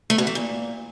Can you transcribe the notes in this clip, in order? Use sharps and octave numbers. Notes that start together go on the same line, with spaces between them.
A3
B2
E3
A#2